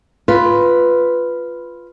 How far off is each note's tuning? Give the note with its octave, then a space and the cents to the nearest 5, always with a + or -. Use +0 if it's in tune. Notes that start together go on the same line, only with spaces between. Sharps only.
F4 +0 B4 +0